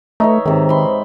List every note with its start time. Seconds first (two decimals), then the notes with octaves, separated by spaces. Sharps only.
0.20 A3 D#4 C#5 E5
0.46 G#2 C3 D#3
0.69 B5 C6